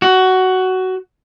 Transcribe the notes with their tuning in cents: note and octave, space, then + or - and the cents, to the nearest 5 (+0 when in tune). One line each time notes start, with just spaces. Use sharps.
F#4 +15